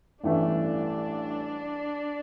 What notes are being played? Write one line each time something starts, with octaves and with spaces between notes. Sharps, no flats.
A1 G2 E3 A3 D4